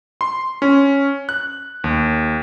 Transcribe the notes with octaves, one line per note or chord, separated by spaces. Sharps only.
C6
C#4
F#6
D#2